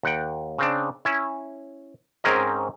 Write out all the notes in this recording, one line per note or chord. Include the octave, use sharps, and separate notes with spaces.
D#2 F#5 G5
C#3 C4 D4
C#4 E4
G#2 C4 C#4 G#4 A#4 D#5